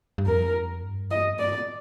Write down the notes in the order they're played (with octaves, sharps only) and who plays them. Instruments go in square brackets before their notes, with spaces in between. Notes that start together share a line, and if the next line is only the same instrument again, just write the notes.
[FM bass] G2
[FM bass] F2 [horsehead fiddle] A#4
[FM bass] G2
[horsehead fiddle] D#5
[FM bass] A2
[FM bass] G2 [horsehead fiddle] D5
[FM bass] A2